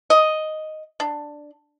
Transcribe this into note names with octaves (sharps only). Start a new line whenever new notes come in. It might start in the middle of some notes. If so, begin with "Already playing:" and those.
D#5
D4